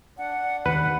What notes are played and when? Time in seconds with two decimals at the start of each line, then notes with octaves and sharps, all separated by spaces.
0.18 D4 F#5
0.66 D#2 B4 F#5